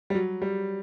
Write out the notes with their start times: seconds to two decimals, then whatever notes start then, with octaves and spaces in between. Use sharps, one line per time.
0.10 G3
0.15 F#3
0.42 G3